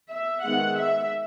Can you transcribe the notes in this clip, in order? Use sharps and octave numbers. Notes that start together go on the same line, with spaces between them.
E5
D#3 G#3 B3 F#5
E5